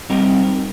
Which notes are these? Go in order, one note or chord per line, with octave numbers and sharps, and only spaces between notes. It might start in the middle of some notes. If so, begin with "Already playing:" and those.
G3 C4 D#4 G4 A#4